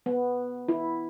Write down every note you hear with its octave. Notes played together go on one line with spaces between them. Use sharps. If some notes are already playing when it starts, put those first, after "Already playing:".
B3
E4